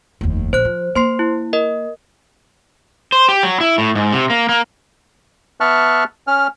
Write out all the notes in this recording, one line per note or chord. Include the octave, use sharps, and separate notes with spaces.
F1 D#2
A#1 C5 F#6
F3
A#3 C5 C6 C7
E4
A#4 D#5
C5
G4
F#3
E4
A2
G#2
C3
A#3
A#3
B3 E5 A5 C#6 F6 F#6
C#4 F6